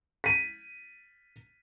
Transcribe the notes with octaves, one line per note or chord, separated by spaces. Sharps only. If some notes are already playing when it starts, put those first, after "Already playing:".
B6 D#7